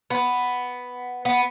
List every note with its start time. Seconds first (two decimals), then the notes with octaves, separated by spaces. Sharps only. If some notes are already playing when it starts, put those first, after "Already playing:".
0.10 B3
1.25 B3